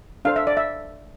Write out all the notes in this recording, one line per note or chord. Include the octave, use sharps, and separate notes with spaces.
D4 A4 C5 F5
E5
D5
E5